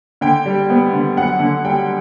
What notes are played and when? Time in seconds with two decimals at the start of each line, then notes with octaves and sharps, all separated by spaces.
0.21 D3 G5
0.46 G3
0.70 B3
0.93 D3
1.17 F#2 F#5
1.40 D3
1.65 G3 G5